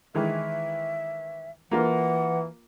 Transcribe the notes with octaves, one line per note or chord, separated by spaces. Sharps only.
D#3 E3 G#3 E5
E3 A#3 F4 A#4 F#5